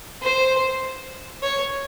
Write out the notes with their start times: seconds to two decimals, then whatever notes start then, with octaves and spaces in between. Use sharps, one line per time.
0.23 C5
1.43 C#5